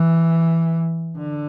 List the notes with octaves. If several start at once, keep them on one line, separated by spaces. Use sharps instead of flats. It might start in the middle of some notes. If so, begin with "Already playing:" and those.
Already playing: E3
D3